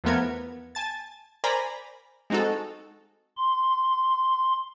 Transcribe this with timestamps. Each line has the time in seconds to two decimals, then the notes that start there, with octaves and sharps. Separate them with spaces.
0.04 E2 F3 A3 B3 A#4 G#6
0.75 G#5 A5 A6
1.44 A#4 C5 D5 G#5 A#5 B5
2.30 G#3 C4 D#4 F#4 A4
3.37 C6